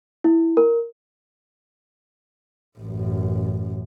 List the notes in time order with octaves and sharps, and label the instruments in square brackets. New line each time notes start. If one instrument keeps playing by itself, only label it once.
[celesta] E4
A#4
[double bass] A1 F#2